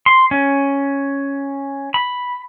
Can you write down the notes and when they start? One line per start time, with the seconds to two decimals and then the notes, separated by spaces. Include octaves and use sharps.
0.06 C6
0.31 C#4
1.94 B5